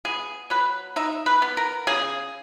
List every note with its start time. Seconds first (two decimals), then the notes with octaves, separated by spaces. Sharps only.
0.05 B3 G#4
0.50 F#3 B4
0.96 D#4 E5
1.26 B4
1.42 B3
1.57 A#4
1.87 C#3 G#4